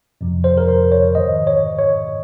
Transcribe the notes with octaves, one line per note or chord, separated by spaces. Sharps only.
F2 C3 F3
C5
A#4
C5
C#5
G#2 D#3 D#5
C#5
C#5